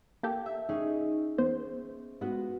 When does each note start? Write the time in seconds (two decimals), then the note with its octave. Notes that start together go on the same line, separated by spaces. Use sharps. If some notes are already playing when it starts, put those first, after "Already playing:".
0.23 A#3 G4 A4
0.46 E5
0.69 C#4 D#4 G#4
1.38 E2 B3 C5
2.21 G#2 B3 F4 F#4